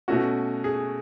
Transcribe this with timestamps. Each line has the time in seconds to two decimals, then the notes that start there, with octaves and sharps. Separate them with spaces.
0.08 B2 A3 C#4 F#4
0.64 G#4